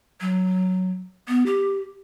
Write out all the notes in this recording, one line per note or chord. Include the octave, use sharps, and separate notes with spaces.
F#3
B3
G4